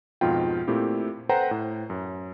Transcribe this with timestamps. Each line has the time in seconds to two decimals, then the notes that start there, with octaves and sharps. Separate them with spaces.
0.21 F2 G#2 B2 F4 G5
0.68 A#2 A3 C4 E4 G4
1.29 A4 B4 C5 F#5 G5 A#5
1.51 A2
1.90 F#2